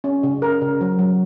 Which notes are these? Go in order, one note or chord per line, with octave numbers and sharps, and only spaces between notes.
C#4
C#3
A#4
C#3
F#3
F#3